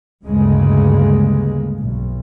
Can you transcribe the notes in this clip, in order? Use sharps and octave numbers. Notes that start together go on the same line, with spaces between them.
D2 G2 C#3 G#3 A#3
B1